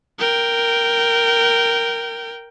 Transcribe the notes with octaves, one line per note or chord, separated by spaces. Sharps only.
A#4 G5